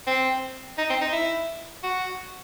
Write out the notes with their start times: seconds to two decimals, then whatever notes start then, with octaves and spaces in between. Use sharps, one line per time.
0.07 C4
0.78 D#4
0.90 C4
1.01 D#4
1.13 E4
1.83 F#4